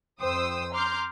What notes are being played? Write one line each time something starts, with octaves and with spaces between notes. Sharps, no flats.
F2 C5 G5 D#6 E6
A#5 C6 D6 F6 G6